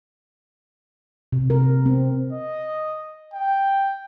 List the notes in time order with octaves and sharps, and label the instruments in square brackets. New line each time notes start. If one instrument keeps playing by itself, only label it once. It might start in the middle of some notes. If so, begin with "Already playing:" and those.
[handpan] C3
A#4
C4
[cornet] D#5
G5